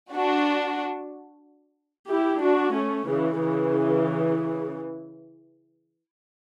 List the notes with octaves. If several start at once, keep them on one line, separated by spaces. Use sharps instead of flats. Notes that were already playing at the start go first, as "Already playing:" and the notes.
D4 F#4
E4 G4
D4 F#4
A3 C#4
C#3 E3
C#3 E3